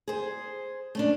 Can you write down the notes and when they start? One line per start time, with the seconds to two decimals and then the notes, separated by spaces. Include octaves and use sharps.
0.08 G#4 C5
0.95 A3 C#4 D4